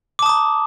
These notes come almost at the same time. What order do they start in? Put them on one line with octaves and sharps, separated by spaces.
D6 A5 D#6 A#5